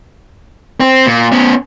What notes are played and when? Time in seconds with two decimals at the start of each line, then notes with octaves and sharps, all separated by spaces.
0.80 C4
1.06 A#2
1.32 B3 C#4